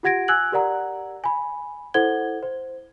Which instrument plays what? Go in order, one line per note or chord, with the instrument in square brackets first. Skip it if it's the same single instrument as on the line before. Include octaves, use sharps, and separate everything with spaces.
[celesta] F4 G4 F#5 G#6 A#6 D7
G#5 E6 F#6 G#6 F#7
G4 A#4 D5 F#5 A#5
G#5 B5
E4 A4 C5 F#5 G#6 G7
C5